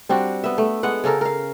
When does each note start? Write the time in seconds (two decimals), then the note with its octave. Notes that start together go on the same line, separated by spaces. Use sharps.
0.09 G3 C4 D4 F#4
0.44 B3 E5
0.58 A3
0.83 G#3 B3 F#5
1.04 C#3 C#4 A4 A#4
1.21 A#4 F5